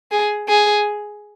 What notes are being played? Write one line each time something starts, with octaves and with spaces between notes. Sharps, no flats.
G#4
G#4